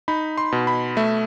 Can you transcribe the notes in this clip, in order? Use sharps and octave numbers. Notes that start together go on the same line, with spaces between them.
D#4 B5
C6
B2
B5
A3 E5